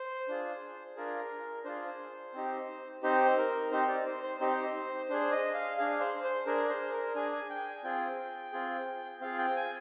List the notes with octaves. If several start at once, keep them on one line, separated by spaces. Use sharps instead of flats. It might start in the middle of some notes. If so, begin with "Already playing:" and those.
Already playing: C5
D4 F4 G#4
D4 F4 G#4 A#4
D4 F4 G#4 C5
C4 D#4 G4
C4 D#4 G4 C5
A#4
C4 D#4 G4 C5
D5
C5
C5
C4 D#4 G4 C5
D4 G#4 C5
D#5
F5
D4 G#4 F5
C5
C5
D4 G#4 A#4
C5
A#4
D4 G#4 G#5
G#5
G5
G#5
C4 F4 G#4 G5
C4 F4 G#4
C4 F4 G#4 F5
G5
G#5